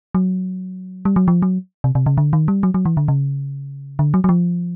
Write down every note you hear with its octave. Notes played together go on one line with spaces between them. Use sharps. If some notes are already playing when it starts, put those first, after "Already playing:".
F#3
G3
F#3
F3
F#3
C3
C3
C#3
D3
D#3
G3
F#3
F#3
E3
D3
C#3
D3
F#3
F#3
F3